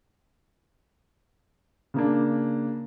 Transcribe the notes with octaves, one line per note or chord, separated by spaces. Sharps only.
C#3 A#3 D4